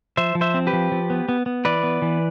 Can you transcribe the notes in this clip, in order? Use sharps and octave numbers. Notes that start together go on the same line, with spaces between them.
F3 C5 E5
F3
C5 E5
C4
G4 B4
F3
F3
B3
B3
B3
E3 B4 D5
B3
E3